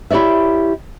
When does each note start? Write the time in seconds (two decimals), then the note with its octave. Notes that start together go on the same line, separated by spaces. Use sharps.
0.11 E4 G4 C#5 D5 E5